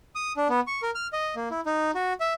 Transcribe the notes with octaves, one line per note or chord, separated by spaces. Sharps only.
D#6
D4
B3
C#6
A#4
F6
D#5
A#3
E4
D#4
F#4
E5